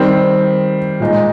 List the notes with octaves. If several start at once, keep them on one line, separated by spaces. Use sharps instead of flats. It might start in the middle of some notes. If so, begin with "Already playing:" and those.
Already playing: D#3 G3 C4
A#2 G#3 D#4